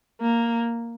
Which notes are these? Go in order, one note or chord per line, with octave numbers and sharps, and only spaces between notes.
A#3